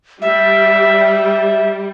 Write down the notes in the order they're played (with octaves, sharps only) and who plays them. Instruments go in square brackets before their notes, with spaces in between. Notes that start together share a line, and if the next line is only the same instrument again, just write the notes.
[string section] G3 [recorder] E5